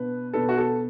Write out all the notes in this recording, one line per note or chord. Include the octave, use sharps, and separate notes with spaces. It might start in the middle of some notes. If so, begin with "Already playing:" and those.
Already playing: B2 B3 D4 B4
B2 B3 D4 A4 B4
F#4
A4